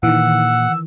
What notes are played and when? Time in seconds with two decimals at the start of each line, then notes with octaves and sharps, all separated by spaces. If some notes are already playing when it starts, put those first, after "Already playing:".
0.03 A#2 D#3 E3 F#5 E6